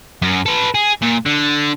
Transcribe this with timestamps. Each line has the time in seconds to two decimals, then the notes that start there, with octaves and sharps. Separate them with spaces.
0.22 F#2
0.46 A4 B4
0.74 G#4
1.02 A#2
1.26 D3